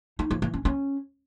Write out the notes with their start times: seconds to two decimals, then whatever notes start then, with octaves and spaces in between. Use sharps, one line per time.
0.19 D#4
0.31 F3
0.42 E3
0.54 C#4
0.65 C#4